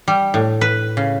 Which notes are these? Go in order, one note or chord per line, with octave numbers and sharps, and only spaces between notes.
G3
A2
B4
C#3